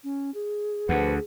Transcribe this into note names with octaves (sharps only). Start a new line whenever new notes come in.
C#4
G#4
D2 F3 B4 F#5